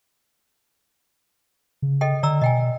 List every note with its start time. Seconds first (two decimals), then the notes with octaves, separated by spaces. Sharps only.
1.82 C#3
2.01 A4 D#5 G5
2.23 D3 D5 A#5 E6
2.42 B2 D#5 G5 G#5